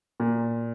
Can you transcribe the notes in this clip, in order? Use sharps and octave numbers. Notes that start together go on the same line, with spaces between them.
A#2